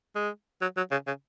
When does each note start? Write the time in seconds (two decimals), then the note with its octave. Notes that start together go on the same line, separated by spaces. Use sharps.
0.15 G#3
0.62 F#3
0.77 F#3
0.91 C#3
1.07 C#3